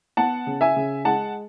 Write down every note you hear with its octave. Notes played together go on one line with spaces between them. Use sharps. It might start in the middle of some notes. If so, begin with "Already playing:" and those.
B3 F#5 A5
C#3
E5 G#5
C#3
G#3 F#5 A5